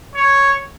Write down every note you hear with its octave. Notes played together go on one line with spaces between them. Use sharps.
C#5